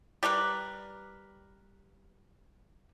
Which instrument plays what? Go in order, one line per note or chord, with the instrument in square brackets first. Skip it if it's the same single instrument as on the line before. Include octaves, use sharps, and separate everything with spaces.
[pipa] G3 G4 A#4 B4